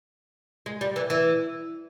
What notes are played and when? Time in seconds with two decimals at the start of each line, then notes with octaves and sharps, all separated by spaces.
0.66 G#3
0.81 G3
0.96 E3
1.10 E3